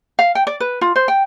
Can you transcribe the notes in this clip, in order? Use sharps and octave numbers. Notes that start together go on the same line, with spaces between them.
F5
G5
D5
B4
F4
C5
G5